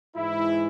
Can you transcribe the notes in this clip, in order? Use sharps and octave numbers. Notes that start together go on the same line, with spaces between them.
G#2 E3 G#3 E4